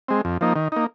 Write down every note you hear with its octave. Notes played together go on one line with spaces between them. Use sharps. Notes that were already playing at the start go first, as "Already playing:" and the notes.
G#3 C4
F2
F3 A#3 D#4
D#3
A#3 D#4